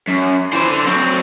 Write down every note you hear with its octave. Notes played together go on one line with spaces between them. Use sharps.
F#2
E3 C5
D3
F#3 C4